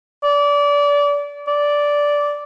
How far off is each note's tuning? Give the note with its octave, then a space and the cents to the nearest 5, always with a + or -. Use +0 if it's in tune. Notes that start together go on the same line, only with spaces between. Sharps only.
D5 -25
D5 -10